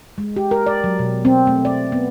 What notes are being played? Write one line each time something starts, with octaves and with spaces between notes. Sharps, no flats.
G#3
G4
A#4
D5
F#3
B2
C4
A3
D5
B3